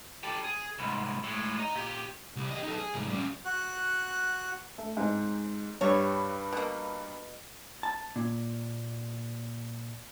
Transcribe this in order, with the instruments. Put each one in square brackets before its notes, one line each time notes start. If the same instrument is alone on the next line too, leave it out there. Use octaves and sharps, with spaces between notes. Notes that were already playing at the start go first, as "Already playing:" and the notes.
[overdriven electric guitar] G4 A4
G#4
C2 G#2
A2 G#3
D#5 A#5
A#2 G4
[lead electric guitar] C2
G4 D#5
D#4 A4
G#4
C2 G#2
G3 C#4
[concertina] F#4 F#6
[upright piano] A3
G#2 C4
[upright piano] G2 G3 [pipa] C#5
[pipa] B2 A#3
[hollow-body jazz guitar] A5
A#2